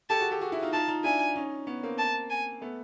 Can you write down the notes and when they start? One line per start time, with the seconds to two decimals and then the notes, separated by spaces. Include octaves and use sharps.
0.10 G4 A4 A5
0.20 F#4 G#4
0.31 G4 A4
0.41 F#4 G#4
0.52 E4 F#4
0.62 D#4 F4
0.73 D#4 F4 A5
0.88 D#4 F4
1.04 D4 E4 G#5
1.36 C#4 D#4
1.67 B3 C#4
1.83 A#3 C4
1.98 A5
2.30 G#5
2.61 A3 B3